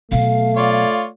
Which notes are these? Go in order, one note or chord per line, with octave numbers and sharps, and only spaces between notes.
B2 F#3 A3 F5
F4 C#5 D5